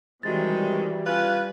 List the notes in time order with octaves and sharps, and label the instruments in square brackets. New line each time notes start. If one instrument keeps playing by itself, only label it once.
[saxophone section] C3 D#3 G#3 [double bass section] E3 G3 [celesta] F#4 A6
[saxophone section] C#4 F4 B4